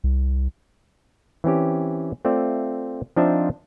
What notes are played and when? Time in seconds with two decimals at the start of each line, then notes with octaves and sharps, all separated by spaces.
0.04 C2
1.44 E3 C4 C#4 G4
2.25 A3 C4 F4 D5 E5
3.16 F3 C4 D4 D#4 F4 E5